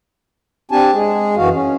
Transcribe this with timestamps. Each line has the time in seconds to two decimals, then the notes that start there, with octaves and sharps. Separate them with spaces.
0.71 C4 D4 G4 G#5 A5
0.93 G#3 G#4
1.37 F#2 E3 F#4 F5
1.53 C#4